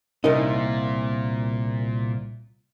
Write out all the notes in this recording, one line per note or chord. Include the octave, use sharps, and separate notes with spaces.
C2 A#2 C#4 D#4 A#4 D#5